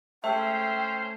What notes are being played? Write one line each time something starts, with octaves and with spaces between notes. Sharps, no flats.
A3 C#4 C5 E5 G5